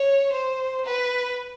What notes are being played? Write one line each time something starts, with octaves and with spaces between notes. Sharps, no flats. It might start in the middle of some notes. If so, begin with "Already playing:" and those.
Already playing: C#5
C5
B4